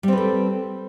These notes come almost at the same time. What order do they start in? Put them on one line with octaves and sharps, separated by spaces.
G3 C4 B4 A4